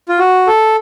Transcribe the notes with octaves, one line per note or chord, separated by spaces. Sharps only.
F4
F#4
A4